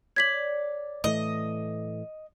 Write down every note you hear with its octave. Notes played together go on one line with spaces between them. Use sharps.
C#5 D5 G#6 B6 F#7
A2 E3 A3 D#5